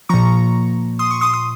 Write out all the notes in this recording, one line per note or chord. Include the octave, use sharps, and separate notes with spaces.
A#2 F3 A#5 C#6
C6 D#6
C#6
C6 D#6
D#6